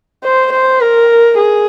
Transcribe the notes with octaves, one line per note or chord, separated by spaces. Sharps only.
C5
C5
A#4
G#4